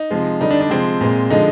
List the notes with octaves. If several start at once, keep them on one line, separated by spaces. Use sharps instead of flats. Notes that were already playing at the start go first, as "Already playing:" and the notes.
Already playing: D#4
C3 F3 G#3
D3 G3 D#4
D4
D4
C3 F3 G#3 C4
A#2 G#3
D3 F3 G#3 D#4